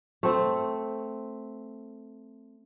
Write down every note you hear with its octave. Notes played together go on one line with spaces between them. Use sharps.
A3 C4